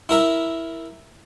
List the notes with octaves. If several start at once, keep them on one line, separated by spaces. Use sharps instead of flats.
E4 A#4 E5